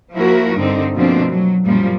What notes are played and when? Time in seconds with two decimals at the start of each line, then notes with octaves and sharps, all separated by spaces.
0.14 F3 A#3 E4 F#4 A#4
0.55 G2 D3 C4 D#4
0.95 B2 F3 A3 A#3 C4 D4
1.30 F#3
1.65 F#2 A#2 F3 G3 A#3